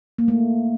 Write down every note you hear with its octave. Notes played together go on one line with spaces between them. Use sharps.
A#3
A3